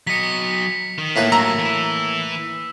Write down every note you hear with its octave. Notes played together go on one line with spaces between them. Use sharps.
F#3 D#5 B6 C#7
D#3
A2 A#3 B4 B6
G2 F#3 A#5 E6
E3 E4